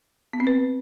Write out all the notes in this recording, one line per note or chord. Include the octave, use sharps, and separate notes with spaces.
B3
C4
B4